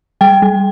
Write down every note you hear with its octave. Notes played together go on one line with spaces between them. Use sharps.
G3 G5
G3